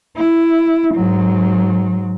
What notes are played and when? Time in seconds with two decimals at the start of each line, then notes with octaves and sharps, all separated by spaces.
0.17 E4
0.94 G#2 F#3